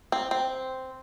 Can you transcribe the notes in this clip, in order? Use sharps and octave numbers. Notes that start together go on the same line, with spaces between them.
C4
C4